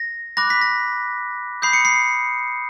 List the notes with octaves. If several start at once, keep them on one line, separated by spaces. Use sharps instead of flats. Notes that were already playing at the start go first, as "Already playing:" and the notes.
Already playing: A#6
B5 D6 F#6 A#6
B6
A#6
B5 D#6 G6 C7
C#7
C7